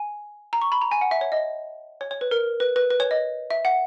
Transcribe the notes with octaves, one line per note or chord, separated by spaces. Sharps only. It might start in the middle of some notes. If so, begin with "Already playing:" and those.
Already playing: G#5
A#5
C#6
B5
A#5
G#5
F#5
E5
C#5
D#5
C#5
C#5
B4
A#4
B4
B4
B4
C#5
D#5
E5
F#5